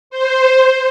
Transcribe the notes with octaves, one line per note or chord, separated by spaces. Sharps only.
C5